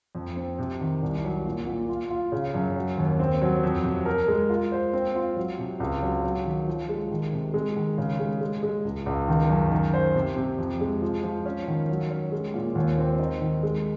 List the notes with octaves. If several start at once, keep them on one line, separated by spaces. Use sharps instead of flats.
F2
C4
C3
D#3
C2
F#3
A#2
A#2
F4
F4
C#3
F#2
F#3
D#2
C4
F#3
F2
C3
A#4
G#3
F4
C5
C4
F4
F#3
C3
C#2
F#3
F#3
D#3
F3
G#3
D#3
C3
G#3
D#3
C#3
G#3
G#3
G#3
C#2
C#2
D#3
F#2
D#3
C5
C3
C3
F2
G#3
F3
F3
C#4
D#3
F#3
C#4
G#3
A#2
D#2
C4
D#4
D#3
G#3